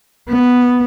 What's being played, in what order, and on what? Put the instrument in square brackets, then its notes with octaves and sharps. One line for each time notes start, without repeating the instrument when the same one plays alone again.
[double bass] B3